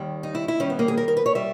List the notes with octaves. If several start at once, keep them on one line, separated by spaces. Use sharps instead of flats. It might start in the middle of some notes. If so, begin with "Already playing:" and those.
Already playing: D#2 D#3 G3
D#4
E4
E4
D#2 D#3 G3 C#4
B3
A#3
G#4
A#4
A#4
B4
C#5
G3 E5